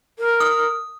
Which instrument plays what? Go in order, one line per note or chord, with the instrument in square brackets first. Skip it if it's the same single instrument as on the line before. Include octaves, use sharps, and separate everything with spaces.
[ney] A#4
[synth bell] D#6